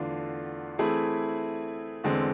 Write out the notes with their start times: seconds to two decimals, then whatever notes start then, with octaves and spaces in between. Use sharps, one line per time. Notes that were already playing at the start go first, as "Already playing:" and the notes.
Already playing: E2 D3 A3 D4 F4
0.78 E3 A3 C4 E4 G#4
2.04 E2 D3 G#3 C4